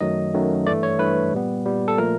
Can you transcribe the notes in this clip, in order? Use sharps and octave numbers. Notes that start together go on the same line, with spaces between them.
F#2 D#3 F#3 A3 D#5
F#2 D#3 F#3 A3
G2 E3 A3 D5
C#5
G2 E3 A3 B4
A#2 G3 B3
A#2 G3 B3
A4
A#2 F3 A3 A#4